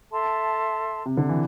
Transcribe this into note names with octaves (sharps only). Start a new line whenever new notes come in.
A4 E5 A5 C6
C3
D3
E3